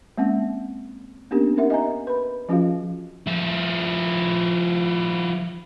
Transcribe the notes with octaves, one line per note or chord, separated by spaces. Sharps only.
G#3 A#3 C4 C#4 F#5
A#3 B3 C#4 D4 G4 A#4
C#4 D#4 A#4 E5 F#5
D#5 G#5 A#5
B4 B5
F3 C#4 F4 F#4 G#4 F5
F3 E4